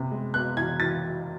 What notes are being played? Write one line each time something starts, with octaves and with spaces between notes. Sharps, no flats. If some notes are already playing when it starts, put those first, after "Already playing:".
Already playing: C3 B3
G#3
B3 F#6
E3 G#6
E3 A6